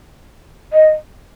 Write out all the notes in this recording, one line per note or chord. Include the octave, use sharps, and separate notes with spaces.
D#5